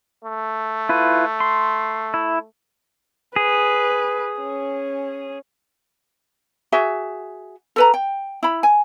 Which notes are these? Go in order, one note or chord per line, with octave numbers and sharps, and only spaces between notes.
A3
E4 F4 B4
C6
E4
G#4 B4
C#4
F#4 G#4 E5
A4 B4 A#5
G5
E4 B5
G#5